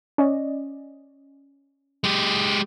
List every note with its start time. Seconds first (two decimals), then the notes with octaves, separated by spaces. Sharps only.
0.18 C#4 D5 D#5
2.04 G#3 G4